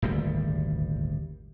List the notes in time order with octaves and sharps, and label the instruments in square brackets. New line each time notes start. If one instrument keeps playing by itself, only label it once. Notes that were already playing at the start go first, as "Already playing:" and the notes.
[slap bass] D#1 G#1 D2 G3